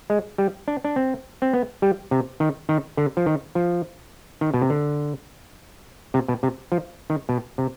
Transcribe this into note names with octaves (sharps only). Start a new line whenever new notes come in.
G#3
G3
D4
D4
C4
C4
B3
G3
C3
D#3
D#3
D3
F3
D#3
F3
D#3
B2
C3
D3
C3
B2
C3
F3
D#3
B2
C3